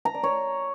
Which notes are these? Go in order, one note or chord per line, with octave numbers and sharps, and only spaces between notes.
A#5
D5
C#5